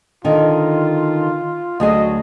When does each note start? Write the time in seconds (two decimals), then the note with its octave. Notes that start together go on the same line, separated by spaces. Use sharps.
0.24 D3 D#3 F4
1.80 D2 F#3 G#4 D#5